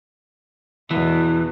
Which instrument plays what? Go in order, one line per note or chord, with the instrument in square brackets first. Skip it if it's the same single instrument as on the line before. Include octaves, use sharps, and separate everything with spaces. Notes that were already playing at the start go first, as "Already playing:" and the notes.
[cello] E2 B2 [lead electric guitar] E3